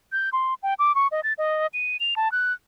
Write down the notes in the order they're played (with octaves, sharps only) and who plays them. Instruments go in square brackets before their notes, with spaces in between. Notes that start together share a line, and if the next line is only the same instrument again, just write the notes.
[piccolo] G6
C6
G5
D6
C#6
D#5
A6
D#5
D#7
F7
A5
F#6